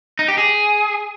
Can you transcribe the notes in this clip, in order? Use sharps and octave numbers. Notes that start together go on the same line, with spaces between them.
D#4
G4
G#4